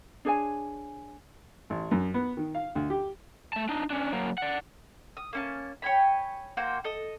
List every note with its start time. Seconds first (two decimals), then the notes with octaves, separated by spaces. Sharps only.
0.25 D4 G#4 C#5 G#5
1.70 A1
1.91 F#2
2.14 B3
2.37 D#3
2.55 F5
2.75 D2
2.90 G4
3.53 A3 A5
3.69 D4 D#4
3.90 C#4 D4
4.12 F#3 A#3
4.38 D5 F#5
5.17 D#6
5.33 A#3 C#4 A5
5.82 C#5 G5 G#5 B5
6.57 A#3 F#4 C5 G5
6.84 A4 D#5